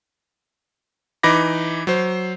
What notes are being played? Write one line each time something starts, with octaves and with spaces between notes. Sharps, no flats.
E3 D#4 B5 D6 A#6
F#3 C5